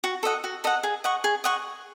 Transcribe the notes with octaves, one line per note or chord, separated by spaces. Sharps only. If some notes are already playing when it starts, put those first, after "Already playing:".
F#4
A4 D#5 F#5
F#4
A4 D#5 F#5
G#4
D#5 F#5 C#6
G#4
D#5 F#5 C#6